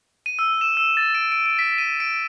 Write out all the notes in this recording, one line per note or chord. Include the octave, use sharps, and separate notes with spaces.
D#7
E6
E7
E6
A6
D7
D7
D7
B6
D#7
D7